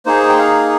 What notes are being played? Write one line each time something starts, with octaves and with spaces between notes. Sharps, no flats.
A#3 D#4 G#4 C5
G5
F5